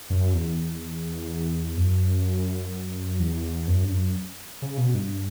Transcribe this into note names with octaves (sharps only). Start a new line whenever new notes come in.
F#2
E2
F#2
E2
F#2
G2
F#2
C#3
B2
G2